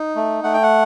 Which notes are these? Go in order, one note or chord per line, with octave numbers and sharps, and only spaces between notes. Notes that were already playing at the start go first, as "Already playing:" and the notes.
Already playing: D#4
A3
A3 F#5
G5
F#5